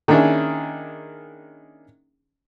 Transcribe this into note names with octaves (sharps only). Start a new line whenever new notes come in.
D#3 A#3 C#4 D4 E4 G#4